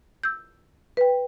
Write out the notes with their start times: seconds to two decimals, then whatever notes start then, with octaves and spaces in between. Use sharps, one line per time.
0.23 E6 G6
0.97 B4 G5